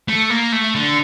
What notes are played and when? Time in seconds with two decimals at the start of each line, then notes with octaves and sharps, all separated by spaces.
0.08 A3
0.30 A#3
0.53 A3
0.75 D3